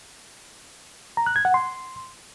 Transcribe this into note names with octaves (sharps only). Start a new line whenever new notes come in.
A#5
F#6
G#6
F#5
C6